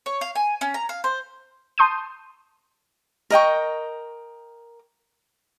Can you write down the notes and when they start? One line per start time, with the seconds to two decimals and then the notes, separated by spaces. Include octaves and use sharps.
0.06 C#5
0.21 F5
0.35 G#5
0.61 C#4
0.74 A#5
0.89 F5
1.04 C5
1.78 A5 C6 D#6 G6 D#7
3.30 A#4 D#5 G5 C#6